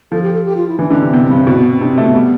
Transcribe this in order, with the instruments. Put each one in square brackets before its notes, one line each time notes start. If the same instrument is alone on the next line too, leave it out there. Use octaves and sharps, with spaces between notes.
[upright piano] F3 [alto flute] A4
[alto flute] G4
A4
G4
F4
E4
[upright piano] E3 [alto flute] D4
[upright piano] D3 [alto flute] D4
[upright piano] C3 [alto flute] C4
[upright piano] C3 [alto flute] B3
[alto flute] C4
[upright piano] G2
[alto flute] C4
[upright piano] B2 [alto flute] C4
[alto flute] B3
C4
[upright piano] C3 [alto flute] D4
[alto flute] C4
[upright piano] A3
[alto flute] B3
[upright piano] G3